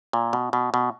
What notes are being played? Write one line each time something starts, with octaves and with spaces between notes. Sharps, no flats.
A#2
B2
B2
B2